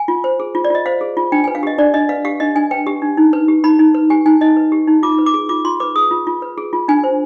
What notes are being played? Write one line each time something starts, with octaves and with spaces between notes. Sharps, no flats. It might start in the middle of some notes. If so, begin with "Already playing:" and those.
Already playing: G#5
F4
C5
G#4
F4
D5
F4 D#5
C5 F5
G#4
F4
D4 G5
B4 G#5
F5
G4 D#5
D4 D5
D4 D#5
B4 F5
G4 F5
D4 D#5
D4 G#5
B4 G5
G4
D4
D#4
B4
G4
D#4 B5
D#4
B4
G4 G#5
D#4 G#5
D#4 D#5
B4
G4
D#4
F4 D6
B4
D6
G#4
F4 D6
F4 C6
B4 D6
G#4 D#6
F4
F4
B4
G#4
F4
D4 G#5
C5